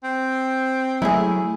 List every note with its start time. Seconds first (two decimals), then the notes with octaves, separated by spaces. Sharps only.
0.04 C4
1.02 F#3 G#3 A3 E4 G#4